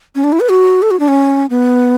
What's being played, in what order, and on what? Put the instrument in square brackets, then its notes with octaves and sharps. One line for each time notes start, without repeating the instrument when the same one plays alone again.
[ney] C#4
D4
E4
B4
F#4
A4
F#4
D4
C#4
B3